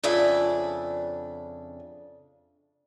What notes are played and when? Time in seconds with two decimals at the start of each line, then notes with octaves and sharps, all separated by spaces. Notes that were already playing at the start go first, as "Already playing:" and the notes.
0.03 F2 C#3 D4 E5 G#5